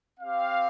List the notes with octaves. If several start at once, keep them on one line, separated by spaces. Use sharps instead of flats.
C4 G4 F5